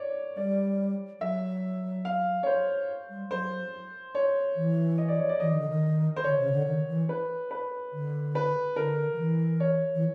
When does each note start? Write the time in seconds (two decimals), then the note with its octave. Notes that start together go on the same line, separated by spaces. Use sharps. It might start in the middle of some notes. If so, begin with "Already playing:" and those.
Already playing: C#5 D5
0.37 G3 D5
1.20 F#3 E5
2.05 F5
2.43 C#5
2.46 C5
3.10 G3
3.31 F#3 C5
4.15 C#5
4.56 E3
4.98 D#5
5.08 D5
5.19 C#5
5.29 D5
5.40 E3 D#5
5.50 D#3
5.60 D3
5.69 D#3
6.16 C5
6.24 D3 C#5
6.39 C#3
6.52 D3
6.67 D#3
6.88 E3
7.09 B4
7.51 B4
7.93 D3
8.35 B4
8.76 D3 A#4
9.14 F3
9.18 E3
9.60 C#5
9.95 E3